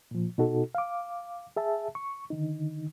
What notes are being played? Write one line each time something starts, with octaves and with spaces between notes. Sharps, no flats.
A#2 F3
B2 D#4 F#4 A4
F5 D6
G#4 E5 A5
C#6
D3 D#3 D#4